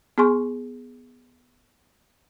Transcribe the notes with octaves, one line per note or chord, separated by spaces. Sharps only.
B3 G#4 G#5 C6 C#6